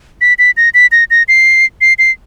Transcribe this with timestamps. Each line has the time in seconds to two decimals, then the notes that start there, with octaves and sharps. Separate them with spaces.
0.21 B6
0.39 B6
0.57 A#6
0.74 B6
0.92 A#6
1.10 A#6
1.28 C7
1.81 C7
1.99 C7